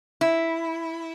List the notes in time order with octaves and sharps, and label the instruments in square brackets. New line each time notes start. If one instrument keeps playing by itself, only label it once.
[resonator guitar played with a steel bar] E4